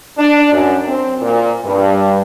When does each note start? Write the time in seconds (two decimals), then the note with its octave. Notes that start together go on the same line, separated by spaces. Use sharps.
0.18 D4
0.52 F#2
0.88 C4
1.21 A#2
1.65 G2